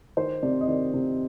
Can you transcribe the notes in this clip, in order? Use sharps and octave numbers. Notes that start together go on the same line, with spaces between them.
D#3 C5
C3 D5
D#5
D#3 D5
C3